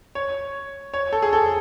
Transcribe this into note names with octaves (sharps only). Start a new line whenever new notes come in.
C#5
C#5
A4
G#4
A4